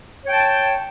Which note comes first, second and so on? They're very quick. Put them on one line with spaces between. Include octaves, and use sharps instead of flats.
C#5 G5 A5